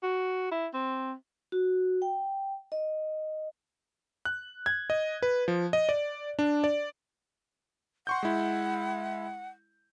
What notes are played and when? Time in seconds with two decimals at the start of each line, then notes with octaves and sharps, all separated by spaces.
0.03 F#4
0.51 E4
0.74 C4
1.52 F#4
2.02 G5
2.72 D#5
4.25 F#6
4.66 G#6
4.90 D#5
5.23 B4
5.48 F3
5.73 D#5
5.89 D5
6.39 D4
6.64 D5
8.07 F#5 C6 C#6 G6
8.23 G#3 E4